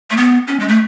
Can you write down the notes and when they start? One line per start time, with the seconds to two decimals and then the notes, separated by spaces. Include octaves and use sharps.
0.11 A3
0.17 B3
0.47 C#4
0.60 G#3
0.68 A3